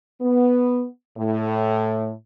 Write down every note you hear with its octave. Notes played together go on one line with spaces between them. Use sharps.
B3
A2